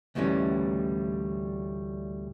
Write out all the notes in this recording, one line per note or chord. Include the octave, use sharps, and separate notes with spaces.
D2 A2 E3 G3 C#4